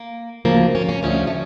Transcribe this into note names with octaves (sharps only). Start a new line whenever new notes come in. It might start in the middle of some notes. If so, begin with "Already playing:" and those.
Already playing: A#3
D2 C#3 F3 A#3
C#4
A#3
C#4
D2 C#3 F3 C#4
A3